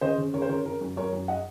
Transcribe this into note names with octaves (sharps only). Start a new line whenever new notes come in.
C#3 C5 D#5
C#3
C#3 A#4 C#5
C5
C#3 A#4 C#5
C#3 A#4
F#2
F#2 A#4 C#5
F#2
D#5 F#5